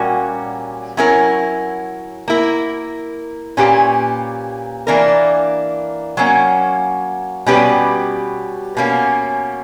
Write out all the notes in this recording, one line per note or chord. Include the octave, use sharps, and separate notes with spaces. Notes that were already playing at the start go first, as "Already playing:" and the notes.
Already playing: A#2 G3 C#4 F#4 A#4
F#3 C#4 E4 A#4
A#3 E4 A#4
A#2 A#3 C#4 G4 B4
E3 A#3 D4 A#4
F#3 A#3 C#4
B2 G3 C#4 G4 B4
B2 A#3 C#4